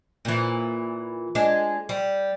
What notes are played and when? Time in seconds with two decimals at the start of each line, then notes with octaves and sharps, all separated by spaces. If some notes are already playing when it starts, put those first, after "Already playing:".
0.25 A#2 E3
1.35 G#3 D4
1.89 G3